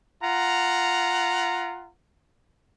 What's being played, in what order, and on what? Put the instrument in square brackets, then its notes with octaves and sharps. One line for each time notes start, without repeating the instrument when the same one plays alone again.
[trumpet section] F4 F#5 A#5